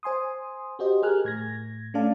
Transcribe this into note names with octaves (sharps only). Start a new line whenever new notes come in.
C5 G#5 C6 D#6
F#4 G4 C5 D#5
G4 G#4 A#4 G#5 F6 F#6
A2 G#6 A#6
A3 C#4 D4 D5 F5 A5